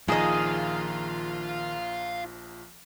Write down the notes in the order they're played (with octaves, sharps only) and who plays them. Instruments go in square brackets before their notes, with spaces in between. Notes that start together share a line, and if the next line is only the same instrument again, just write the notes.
[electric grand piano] A#1 F3 A#5 [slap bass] D#3 [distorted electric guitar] F4 F5 [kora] G#4 D#5